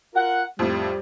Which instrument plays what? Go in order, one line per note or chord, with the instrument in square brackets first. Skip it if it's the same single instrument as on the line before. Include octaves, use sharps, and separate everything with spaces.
[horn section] F4 A#4 F#5
[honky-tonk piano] F2 A2 [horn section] G3